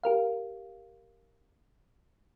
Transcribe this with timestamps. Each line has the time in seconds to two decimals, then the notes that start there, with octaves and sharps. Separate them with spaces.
0.04 G4 A#4 F5